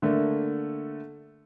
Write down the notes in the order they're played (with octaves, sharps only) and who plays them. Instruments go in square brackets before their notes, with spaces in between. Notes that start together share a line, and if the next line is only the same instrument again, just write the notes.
[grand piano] D3 A3 A#3